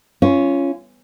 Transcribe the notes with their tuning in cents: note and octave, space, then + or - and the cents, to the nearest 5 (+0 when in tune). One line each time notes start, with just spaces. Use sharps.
C#4 +0 F4 -25